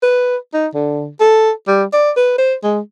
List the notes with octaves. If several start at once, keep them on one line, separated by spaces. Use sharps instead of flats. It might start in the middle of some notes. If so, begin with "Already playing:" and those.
B4
D#4
D3
A4
G3
D5
B4
C5
G#3